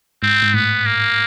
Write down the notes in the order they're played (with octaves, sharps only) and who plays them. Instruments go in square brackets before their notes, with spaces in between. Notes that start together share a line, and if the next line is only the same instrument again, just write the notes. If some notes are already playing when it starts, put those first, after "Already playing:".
[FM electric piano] G#2 [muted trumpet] C4
[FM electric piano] G#2
[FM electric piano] A2 [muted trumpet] B3
[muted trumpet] A#3